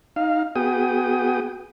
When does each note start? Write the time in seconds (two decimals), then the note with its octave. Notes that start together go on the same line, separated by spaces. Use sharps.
0.16 D#4 F5
0.56 B3 F#4 G#4 G5 D#6